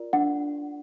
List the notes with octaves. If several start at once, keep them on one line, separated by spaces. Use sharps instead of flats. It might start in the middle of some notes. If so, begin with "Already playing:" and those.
Already playing: F4 A#4 D5
D4 F#5